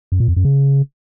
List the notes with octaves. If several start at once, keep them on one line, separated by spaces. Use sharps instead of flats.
F#2
A#2
F2
F#2
C#3